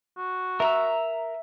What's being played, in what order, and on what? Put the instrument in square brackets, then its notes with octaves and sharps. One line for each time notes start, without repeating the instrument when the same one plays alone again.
[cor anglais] F#4
[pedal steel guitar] A#4 A#5 E6 [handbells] E5